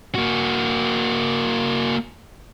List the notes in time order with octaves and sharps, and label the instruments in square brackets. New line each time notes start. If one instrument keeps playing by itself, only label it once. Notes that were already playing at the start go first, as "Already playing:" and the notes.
[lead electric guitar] A#3 F#4